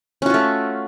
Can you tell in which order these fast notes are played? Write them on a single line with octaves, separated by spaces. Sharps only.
C#4 F#4 F4 A3